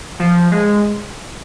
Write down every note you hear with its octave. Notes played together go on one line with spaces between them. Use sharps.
F3
G#3